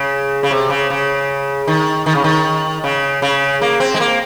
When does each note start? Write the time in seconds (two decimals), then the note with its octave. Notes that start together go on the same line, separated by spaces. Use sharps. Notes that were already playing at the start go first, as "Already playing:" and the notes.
Already playing: C#3
0.43 C#3
0.51 C3
0.70 C#3
0.90 C#3
1.67 D#3
2.06 D#3
2.15 C#3
2.24 D#3
2.84 C#3
3.22 C#3
3.62 A#3
3.80 C4
3.95 G#3
4.00 A#3